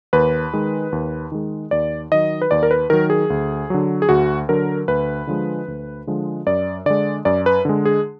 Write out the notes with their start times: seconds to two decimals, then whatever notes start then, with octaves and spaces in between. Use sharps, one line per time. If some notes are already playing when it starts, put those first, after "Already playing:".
0.13 D#2 B4
0.53 D#3 G#3
0.92 D#2
1.32 D#3 G#3
1.71 D#2 D5
2.12 D#3 F#3 D#5
2.42 B4
2.51 D#2 D5
2.63 A#4
2.71 B4
2.90 D#3 F#3 A#4
3.10 G#4
3.30 D2
3.70 D3 F#3
4.02 G#4
4.09 D2 F#4
4.49 D3 F#3 A#4
4.88 D2 B4
5.27 D3 F3 G#3
5.68 D2
6.07 D3 F3 G#3
6.47 F#2 D5
6.86 D3 G#3 D5
7.25 F#2 D5
7.46 B4
7.65 D3 G#3
7.85 G#4